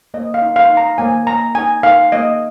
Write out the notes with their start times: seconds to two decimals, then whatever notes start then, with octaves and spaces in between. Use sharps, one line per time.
0.14 A#3 D#5
0.34 F5
0.42 D#4
0.56 F5
0.70 D#4
0.77 A#5
0.98 A#3 G#5
1.27 A#3 A#5
1.55 D#4 G#5
1.83 D#4 F5
2.12 A#3 D#5